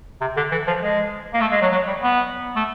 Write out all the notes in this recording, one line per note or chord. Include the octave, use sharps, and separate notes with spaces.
C3
D3
E3
F3
G#3
A#3
A3
G#3
F#3
F#3
G3
B3
A3